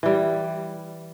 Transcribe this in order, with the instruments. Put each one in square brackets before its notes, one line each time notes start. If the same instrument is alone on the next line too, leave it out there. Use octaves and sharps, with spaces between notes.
[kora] E3 G3